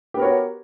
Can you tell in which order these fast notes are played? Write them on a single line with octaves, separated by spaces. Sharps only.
G4 B3 A#4 C#5 F#4